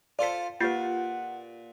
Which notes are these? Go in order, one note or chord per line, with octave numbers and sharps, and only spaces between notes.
F4 A4 C5 D5 B6
A#2 F4 G4 B4 F#5 G6 A6 C7